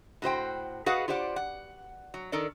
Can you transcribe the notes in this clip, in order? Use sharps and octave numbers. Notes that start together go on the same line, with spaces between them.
A2 F#4 C5 G5
F#4 G#4 B4 D#5 F5 F#5
F4 G4 C5 D5 F#5
F#5
F#3
D#3 A4 A#4 D5